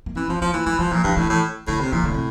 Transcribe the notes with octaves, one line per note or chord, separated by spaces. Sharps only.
A#3
E3 C4
F3 C4
F3 C4
E3 A#3
E3 A3
F3 G3
A#2 F3
G2 E3
A2 E3
A2
A2 D3
C3
A#2 E3
A2 D3
C3